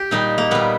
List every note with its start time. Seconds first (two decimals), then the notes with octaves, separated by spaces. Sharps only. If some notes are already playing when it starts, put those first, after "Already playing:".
Already playing: G4
0.11 A#2 G3 D#4
0.38 A#3
0.51 A#2 G3 B3